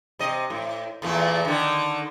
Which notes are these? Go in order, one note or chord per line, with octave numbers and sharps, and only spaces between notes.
C3 D#5
A2
E2 A#2 A3
D3 D#3